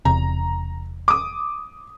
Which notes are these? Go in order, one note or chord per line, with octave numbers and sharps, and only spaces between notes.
E1 E2 C3 A#5
D6 D#6